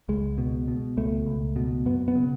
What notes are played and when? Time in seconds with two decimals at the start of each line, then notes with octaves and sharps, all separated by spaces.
0.09 C#2 G#3
0.38 B2
0.68 B2
0.97 C#2 A3
1.26 C#2
1.56 B2
1.86 F#2 B3
2.08 B3
2.15 C#3